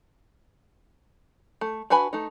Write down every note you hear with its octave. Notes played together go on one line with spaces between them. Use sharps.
A3
D4 F#4 B4 G#5 B5
A3 D#4